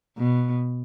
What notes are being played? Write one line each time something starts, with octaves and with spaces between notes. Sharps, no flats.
B2